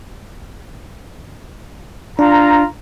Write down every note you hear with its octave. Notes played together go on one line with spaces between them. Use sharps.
D4 F4 A#5